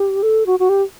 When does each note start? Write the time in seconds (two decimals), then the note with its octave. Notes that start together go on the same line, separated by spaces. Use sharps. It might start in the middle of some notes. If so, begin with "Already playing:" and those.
Already playing: G4
0.23 A4
0.46 F#4
0.59 F#4
0.69 G4